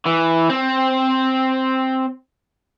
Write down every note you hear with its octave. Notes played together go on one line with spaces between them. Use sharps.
E3
C4